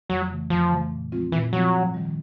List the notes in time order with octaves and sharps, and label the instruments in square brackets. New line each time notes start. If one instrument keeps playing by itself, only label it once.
[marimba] F2 [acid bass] F#3
[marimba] C#3 E3 A3
[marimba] F2 [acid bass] F3
[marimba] C#3 E3 A3
A#2
F3 G#3 C4 F4
[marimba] A#2 [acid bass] E3
[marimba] F3 G#3 C4 F4 [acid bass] F#3
[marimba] G#2
D#3 G3